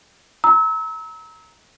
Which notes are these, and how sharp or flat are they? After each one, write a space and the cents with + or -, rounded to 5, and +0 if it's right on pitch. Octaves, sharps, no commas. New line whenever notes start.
A#5 +0 E6 -30